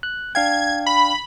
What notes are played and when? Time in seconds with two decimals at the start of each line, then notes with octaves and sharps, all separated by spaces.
0.03 F#6
0.35 D4 F5 G5 G#6
0.86 B5